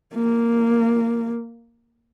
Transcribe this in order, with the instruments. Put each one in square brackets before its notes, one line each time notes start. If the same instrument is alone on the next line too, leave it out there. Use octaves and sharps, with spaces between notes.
[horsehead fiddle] A#3